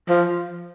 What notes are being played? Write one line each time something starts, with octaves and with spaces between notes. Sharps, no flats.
F3